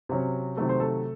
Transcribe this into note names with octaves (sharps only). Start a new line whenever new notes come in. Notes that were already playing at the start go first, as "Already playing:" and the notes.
C3 F#3 C#4
C3 D#3 F#3 A3 A4
C5
A3 A4